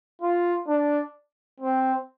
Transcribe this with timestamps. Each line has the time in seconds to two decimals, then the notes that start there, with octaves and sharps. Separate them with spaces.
0.22 F4
0.68 D4
1.60 C4